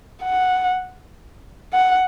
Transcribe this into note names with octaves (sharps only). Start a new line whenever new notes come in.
F#5
F#5